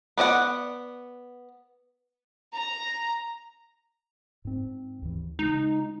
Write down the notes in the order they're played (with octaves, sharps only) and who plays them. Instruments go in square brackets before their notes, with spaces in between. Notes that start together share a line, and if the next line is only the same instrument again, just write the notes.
[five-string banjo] B3 D5 D#5 F#5
[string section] A#5
[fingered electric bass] G#2 C4
D#2 E3
[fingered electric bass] C#3 G#3 [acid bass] D#4